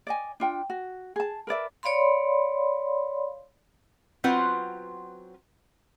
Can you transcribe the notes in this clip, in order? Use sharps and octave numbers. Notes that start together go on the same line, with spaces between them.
D5 D#5 G#5
D4 F4 G5
F#4
G#4 A5
A#4 B4 D5 E5
C#5 D5 F5 B5 C6
F#3 C4 F4 B4 F#5